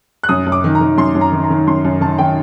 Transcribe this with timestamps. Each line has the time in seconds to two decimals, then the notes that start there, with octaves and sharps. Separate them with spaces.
0.23 F#6
0.29 F#2 D#6
0.46 F#2
0.52 D6
0.64 D#3
0.75 A#5
0.81 D#3
0.98 F#2 C6
1.15 F#2
1.21 A#5
1.32 D#3
1.44 A#5
1.50 D#3
1.67 F#2 C6
1.85 F#2
2.01 D#3 A5
2.18 D#3 G5